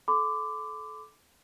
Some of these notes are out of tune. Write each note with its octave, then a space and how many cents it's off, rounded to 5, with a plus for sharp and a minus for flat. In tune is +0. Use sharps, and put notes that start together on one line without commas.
A4 -25 B5 +45 D6 +0